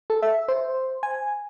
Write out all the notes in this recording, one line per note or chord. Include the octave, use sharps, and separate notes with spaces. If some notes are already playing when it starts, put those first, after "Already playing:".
A4
E5
C5
G#5